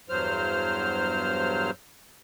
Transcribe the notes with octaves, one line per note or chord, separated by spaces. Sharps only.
E2 G2 F#3 C5 F6